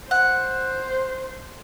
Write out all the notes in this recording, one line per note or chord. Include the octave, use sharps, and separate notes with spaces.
C5 F#5